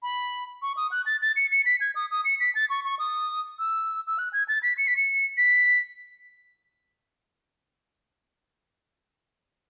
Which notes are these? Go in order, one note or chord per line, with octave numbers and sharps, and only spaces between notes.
B5
C#6
D#6
F#6
A6
A6
C#7
C#7
B6
G#6
D#6
D#6
C#7
B6
A6
C#6
C#6
D#6
E6
E6
F#6
G#6
A6
B6
C#7
B6
C#7
B6